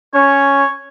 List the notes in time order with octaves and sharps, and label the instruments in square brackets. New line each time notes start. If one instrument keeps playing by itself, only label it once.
[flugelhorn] C#4 [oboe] C#5